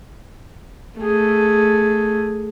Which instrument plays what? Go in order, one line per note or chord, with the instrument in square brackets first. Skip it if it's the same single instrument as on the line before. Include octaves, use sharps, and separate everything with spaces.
[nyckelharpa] A3 G#4